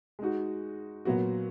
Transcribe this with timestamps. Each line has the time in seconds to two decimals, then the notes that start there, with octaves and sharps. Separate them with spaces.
0.19 G#3 D#4 F#4
1.05 A#2 F#3 B3 F#4